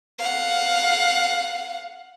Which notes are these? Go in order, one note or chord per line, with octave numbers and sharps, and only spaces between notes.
F5 F#5